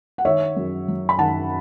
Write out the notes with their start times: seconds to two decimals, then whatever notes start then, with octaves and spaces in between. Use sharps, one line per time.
0.18 F#5
0.25 D#3 C#5 E5
0.57 F#2
0.88 F#3
1.09 B5
1.19 D#3 F#5 A5